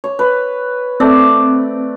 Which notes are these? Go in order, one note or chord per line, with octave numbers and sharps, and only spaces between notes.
C#5
B4
A3 C4 D5